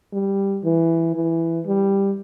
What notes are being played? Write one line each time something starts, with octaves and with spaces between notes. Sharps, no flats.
G3
E3
E3
G3